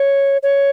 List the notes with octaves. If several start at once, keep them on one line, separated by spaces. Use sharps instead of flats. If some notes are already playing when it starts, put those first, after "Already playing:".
Already playing: C#5
C#5